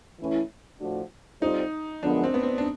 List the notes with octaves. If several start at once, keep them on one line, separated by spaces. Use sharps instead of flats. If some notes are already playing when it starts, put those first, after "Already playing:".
E3 A3 C#4 E4
A2 F3 A3 D4 F#4
G3 C4 D#4 F4 A4 C5
F#2 D3 F3 G#3 B3 D4
C4
B3
C4
D4